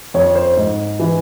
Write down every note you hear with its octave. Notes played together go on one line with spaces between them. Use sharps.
F2 C#5
C5
G#2
E3